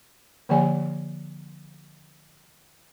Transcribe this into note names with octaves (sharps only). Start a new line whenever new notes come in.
D3 F3 A#3 G4 D5 G#5